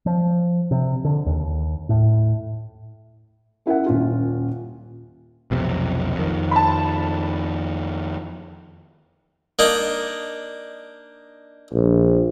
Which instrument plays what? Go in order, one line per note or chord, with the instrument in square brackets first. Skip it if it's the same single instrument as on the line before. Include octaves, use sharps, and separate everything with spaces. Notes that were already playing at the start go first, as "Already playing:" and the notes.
[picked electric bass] F3
C3
D3
D#2
A2
[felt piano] C#4 E4 A#4 E5 F#5
D#1 C#4 F4
[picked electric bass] B1 F2 C3
F2 D#3
[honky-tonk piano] A5 B5
[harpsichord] A#3 D4 D#4
[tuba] A#1